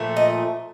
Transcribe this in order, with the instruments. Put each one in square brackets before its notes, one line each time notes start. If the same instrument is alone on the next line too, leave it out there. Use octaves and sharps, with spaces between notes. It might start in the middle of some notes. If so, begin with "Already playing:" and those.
Already playing: [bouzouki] A#2 F3 A3
D#5